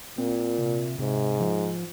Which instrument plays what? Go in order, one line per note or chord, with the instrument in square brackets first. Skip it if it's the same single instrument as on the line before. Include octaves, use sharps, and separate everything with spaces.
[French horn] A#2 [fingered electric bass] C4
[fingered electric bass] C3
[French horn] G#2 [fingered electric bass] C3
[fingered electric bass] F3